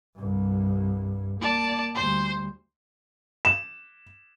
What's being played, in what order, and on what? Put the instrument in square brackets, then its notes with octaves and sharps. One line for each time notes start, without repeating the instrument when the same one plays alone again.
[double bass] C2 G2
[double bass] A#3 [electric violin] D5 A5
[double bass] D2 G3 [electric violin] C5
[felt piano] E7